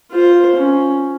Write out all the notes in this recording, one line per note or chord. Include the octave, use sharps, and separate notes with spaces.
F4 C5
C#4